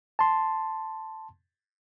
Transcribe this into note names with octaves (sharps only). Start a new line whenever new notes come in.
A5 C6